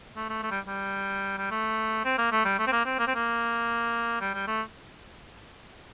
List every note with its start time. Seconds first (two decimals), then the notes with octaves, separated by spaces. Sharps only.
0.16 A3
0.29 A3
0.43 A3
0.51 G3
0.68 G3
1.38 G3
1.51 A3
2.05 C4
2.18 A#3
2.32 A3
2.45 G3
2.59 A3
2.67 C4
2.72 A#3
2.85 C4
2.99 A#3
3.07 C4
3.15 A#3
4.21 G3
4.34 G3
4.47 A3